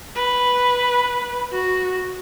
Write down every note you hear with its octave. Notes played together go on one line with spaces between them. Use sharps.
B4
F#4